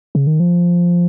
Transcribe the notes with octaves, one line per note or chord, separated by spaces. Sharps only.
C#3
D#3
F3